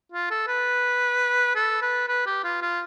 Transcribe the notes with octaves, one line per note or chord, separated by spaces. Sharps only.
F4
A4
B4
A4
B4
B4
G4
F4
F4